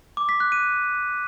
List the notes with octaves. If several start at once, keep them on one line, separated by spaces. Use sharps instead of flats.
D6
B6
F#6
D#7